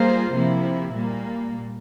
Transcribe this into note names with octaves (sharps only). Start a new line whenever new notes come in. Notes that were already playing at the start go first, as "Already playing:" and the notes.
Already playing: G3 A#3 F4 G#4 C5
C3 F3 A#3 E4
A#2 G3 A#3